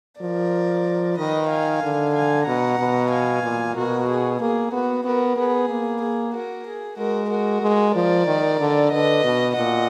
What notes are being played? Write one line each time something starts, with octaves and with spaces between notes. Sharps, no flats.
F3 A#4 D5
D#3 B4 D#5
F5 G#5
D3
F5 G#5
B2 F#5 A#5
B2
F5 G#5
A#2
B2 F#4 A#4
G#4
A#3 G#4
B3 F#4
B3 F#4 A#4
B3 G#4
A#3
G#4
F#4 A#4
G#4
G#3 F#4 A#4
F#4 A#4
G#3
F3 A#4 D5
D#3
D3
D3 B4 D#5
B2
A#2 D#5 F#5